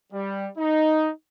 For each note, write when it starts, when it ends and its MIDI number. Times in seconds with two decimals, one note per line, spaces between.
0.13 0.48 55
0.58 1.10 63